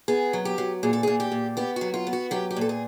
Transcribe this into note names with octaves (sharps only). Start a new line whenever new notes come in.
B3 G#4
F#3
G4
F#3
A#2 G#4
A4
A#2 G#4
G4
A#2
B3 G4
F#4
F#3
F4
B3
F#4
F#3 G4
G4
A#2 A4
G#4